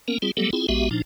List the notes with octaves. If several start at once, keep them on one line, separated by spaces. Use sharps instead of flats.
A#3 B3 C#4 A#4
G3 C4 F4 G#4
F#3 G3 A3 B3 G4 A4
C4 E4 F4 G#4
A#1 G#3 B3 F#4 G4 E5
A#2 F3 D4 D#4